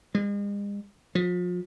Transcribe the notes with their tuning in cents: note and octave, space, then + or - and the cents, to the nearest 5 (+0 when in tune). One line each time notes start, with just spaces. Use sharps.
G#3 -40
F3 +35